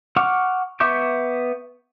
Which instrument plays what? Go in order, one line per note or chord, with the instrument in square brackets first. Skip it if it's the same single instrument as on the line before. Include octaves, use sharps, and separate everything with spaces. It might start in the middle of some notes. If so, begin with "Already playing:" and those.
[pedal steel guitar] F#5 C#6 D6 F6 F#6
B3 E5 C#6 D6 G6